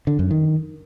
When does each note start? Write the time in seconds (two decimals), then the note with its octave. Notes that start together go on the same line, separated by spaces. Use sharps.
0.07 D3
0.19 F#2
0.31 D#3